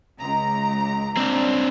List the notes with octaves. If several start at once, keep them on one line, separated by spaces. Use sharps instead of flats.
C#2 A#5
C4 D4